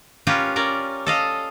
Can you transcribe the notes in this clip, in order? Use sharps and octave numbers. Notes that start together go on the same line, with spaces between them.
C#4 F4 G4 A#4 B4
C#4 A#4 D5
A4 D#5 F5